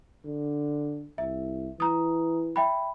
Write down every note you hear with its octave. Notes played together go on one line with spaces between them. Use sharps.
D3
C2 E5
E3 A#5 D#6
E5 G5 B5